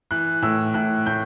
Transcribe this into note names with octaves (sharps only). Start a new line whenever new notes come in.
E3 F#6
A2 E6
A2 F#6
A2 G6